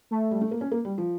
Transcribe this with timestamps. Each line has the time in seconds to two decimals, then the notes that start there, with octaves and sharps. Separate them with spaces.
0.11 A3
0.31 G3
0.41 A3
0.51 A#3
0.61 C#4
0.72 A#3
0.85 G3
0.98 F3